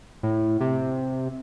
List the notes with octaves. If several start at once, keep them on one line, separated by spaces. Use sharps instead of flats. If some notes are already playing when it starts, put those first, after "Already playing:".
A2
C3